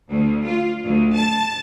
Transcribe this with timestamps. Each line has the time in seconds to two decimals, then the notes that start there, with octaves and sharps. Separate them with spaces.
0.10 D2
0.47 F4
0.84 D2
1.15 A5